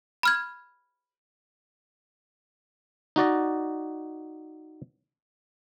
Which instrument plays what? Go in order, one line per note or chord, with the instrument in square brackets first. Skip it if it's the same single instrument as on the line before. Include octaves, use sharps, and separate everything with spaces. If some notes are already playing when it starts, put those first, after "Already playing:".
[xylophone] B5 F6 G#6
[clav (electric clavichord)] D#4 F#4 D5 D#5